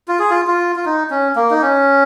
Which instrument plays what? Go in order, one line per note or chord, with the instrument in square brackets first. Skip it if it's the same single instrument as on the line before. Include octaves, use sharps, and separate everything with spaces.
[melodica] F4
G#4
F4
F4
F4
D#4
C#4
A#3
D#4
C#4